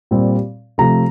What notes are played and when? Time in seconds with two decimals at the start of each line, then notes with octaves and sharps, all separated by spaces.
0.11 A#2 G3 C4
0.78 C3 F3 A3 A#5